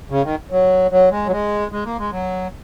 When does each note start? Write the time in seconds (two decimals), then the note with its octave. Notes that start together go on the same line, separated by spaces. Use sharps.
0.10 C#3
0.23 D#3
0.51 F#3
0.91 F#3
1.11 G#3
1.27 F#3
1.31 G#3
1.72 G#3
1.85 A#3
1.99 G#3
2.11 F#3